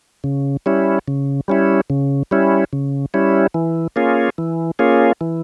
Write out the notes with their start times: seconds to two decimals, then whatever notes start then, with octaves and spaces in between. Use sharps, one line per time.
0.24 C#3
0.66 G3 C#4 E4
1.08 C#3
1.48 G3 C#4 E4
1.90 C#3
2.31 G3 C#4 E4
2.73 C#3
3.14 G3 C#4 E4
3.54 E3
3.96 A#3 C#4 F4 G#4
4.38 E3
4.79 A#3 C#4 F4 G#4
5.21 E3